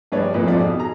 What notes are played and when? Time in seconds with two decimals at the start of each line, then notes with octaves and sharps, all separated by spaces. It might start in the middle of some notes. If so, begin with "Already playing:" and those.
0.12 A#1 G2 B4 C#5 D5
0.33 F2 A#2 B4
0.47 G#1 F2 F3 C4 D5
0.60 B2
0.79 G#4 A#5